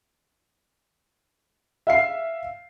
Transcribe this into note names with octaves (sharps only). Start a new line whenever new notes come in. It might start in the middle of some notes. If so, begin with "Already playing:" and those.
E5 F5 C7